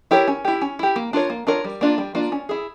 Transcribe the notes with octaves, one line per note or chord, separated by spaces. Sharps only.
E4 G4 A#4 C#5
C#4
E4 G4
C#4
E4 G4
A#3
D4 F4 A#4 C#5
A#3
D4 F4 A#4 C#5
G3
A#3 D4 F4
G3
A#3 D4 F4
C#4
E4 G#4